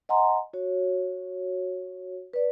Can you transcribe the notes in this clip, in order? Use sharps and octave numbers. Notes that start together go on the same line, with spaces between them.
D#5 F#5 G#5 A#5 C6
F#4 C#5
B4 D5